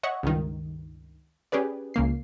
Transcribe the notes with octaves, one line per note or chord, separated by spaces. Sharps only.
C#5 D#5 E5 F#5 C#6
C#2 G2 D#3
C#4 G4 G#4 B4 D5
C#2 C#3 A#3 C7